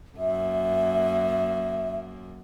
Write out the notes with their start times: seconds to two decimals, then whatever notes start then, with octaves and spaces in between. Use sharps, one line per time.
0.17 F#2 A#3 E5